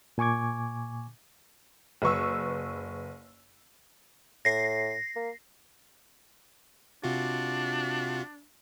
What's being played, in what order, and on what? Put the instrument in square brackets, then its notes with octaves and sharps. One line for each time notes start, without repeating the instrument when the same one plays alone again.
[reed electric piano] A#2 G#5 C#6 D6 G#6
[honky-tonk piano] F#1 B4 C#6 E6
[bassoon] A2 [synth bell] A#6 C7
[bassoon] A#3
[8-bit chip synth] C3 F4 F#4 [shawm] D4